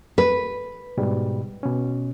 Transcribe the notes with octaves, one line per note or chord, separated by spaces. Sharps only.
B4
G#2 B2 G3
B2 C#4